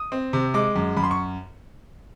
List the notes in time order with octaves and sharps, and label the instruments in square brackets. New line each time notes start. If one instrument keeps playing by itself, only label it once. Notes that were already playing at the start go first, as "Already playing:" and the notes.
Already playing: [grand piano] D#6
C4
C3
G#3 D6
F#2
F#2 B5
C6
C#6